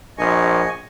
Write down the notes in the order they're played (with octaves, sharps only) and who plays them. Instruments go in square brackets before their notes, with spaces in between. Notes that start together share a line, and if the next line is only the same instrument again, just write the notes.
[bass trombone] A#1 [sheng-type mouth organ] D#5 G#5 C#6